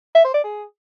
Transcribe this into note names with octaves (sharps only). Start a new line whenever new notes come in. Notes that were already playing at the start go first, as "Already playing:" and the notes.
E5
C5
D5
G#4